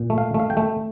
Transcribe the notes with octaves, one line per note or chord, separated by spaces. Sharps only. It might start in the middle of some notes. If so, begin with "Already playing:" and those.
Already playing: A#2
A3
F5
A3
F5
G5
A3